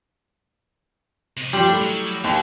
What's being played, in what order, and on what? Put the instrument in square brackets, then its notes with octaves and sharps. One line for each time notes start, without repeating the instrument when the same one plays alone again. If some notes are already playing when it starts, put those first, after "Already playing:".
[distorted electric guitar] C3 D#5
[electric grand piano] F#2 F3 C6 [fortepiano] G3 [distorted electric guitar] D4
[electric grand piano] A3 E4
[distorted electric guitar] F#3
[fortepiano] D#2 [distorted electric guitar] F#3